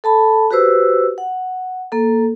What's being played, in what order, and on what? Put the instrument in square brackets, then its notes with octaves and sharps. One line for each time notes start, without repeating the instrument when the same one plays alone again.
[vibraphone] A4 A5 B5
F#4 G4 B4 C5 E6
F#5
A#3 A4